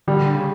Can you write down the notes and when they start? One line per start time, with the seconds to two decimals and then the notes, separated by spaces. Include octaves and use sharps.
0.07 D3 G3
0.35 C#3